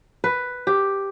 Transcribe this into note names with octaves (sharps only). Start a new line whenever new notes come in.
B4
G4